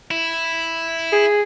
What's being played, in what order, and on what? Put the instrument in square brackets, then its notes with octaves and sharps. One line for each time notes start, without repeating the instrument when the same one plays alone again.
[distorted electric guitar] E4
[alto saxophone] G#4